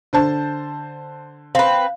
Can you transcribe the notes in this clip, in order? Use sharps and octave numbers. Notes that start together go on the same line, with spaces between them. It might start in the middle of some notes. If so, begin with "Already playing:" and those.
D3 C5 A5
C4 B4 F5